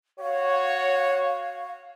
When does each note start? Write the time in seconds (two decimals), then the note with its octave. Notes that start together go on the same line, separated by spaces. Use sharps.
0.20 F#4 C#5 F5